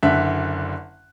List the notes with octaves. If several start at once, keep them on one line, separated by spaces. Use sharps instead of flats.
F#1 D3 E5 F#6